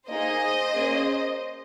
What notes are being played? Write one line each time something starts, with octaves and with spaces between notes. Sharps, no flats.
A#3 D#4 G#4 C5 D#5
A#3 C#4 G#4